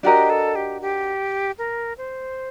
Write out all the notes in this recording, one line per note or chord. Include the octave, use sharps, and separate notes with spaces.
D4 F#4 G4 A#4 D#5
A4
G4
G4
A#4
C5